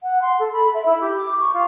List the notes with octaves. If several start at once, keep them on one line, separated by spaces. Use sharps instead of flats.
F#5
C6
A4
B5
E5
E4
G4
D6
C#6
F4